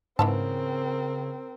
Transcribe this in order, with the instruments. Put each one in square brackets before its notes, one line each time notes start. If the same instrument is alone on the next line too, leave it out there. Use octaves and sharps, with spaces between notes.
[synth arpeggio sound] G#2 [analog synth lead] C#3 [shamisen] E3 B3 A5 [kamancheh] C4 A#4